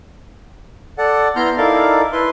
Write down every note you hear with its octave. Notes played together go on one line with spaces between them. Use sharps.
A4 D5 F#5
B3 E4 A#5 C6 F6 G6
D#4 E4 A4 A#4 D5 F5
E4 B4 E5 C6